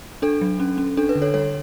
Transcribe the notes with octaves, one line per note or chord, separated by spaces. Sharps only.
D4 A4
F#3
C#4
C#4
D4 A4
B4
D3
A4 C#5
G3 A4 C#5